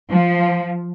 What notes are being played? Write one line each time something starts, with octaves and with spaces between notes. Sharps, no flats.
F3